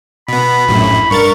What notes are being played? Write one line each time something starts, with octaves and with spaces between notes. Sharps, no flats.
B2 B3 B5
A#1 F#2 A2
G2 A#4 C#6 A6